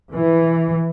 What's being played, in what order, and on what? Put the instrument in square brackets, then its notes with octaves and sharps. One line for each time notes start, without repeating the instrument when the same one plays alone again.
[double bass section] E3